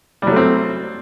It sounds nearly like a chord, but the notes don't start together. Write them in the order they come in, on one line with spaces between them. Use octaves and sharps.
G3 F#3 A3 C4